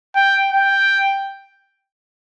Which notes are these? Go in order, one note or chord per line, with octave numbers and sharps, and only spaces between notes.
G5
G5